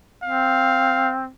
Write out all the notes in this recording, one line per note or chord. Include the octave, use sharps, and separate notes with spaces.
C4 F5